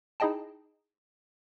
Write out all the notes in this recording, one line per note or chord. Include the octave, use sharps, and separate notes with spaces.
D#4 E4 G#4 D#5 G5 A5